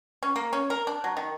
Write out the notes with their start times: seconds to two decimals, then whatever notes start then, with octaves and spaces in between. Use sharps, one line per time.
0.23 C#4
0.36 A#3
0.53 C#4
0.70 A#4
0.87 D4
1.04 F#3
1.17 D#3